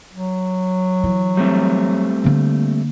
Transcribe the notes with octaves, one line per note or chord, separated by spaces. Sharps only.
F#3
E3
G3 A3 C4
D3 A#3